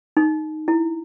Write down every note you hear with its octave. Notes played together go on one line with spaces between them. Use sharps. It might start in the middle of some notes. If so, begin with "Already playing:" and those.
D#4
E4